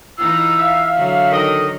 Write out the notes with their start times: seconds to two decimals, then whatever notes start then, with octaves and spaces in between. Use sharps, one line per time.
0.18 E3 D#4 F4 E6
0.58 E5 F5
0.96 D3 F#3
1.31 D#3 A4 D#5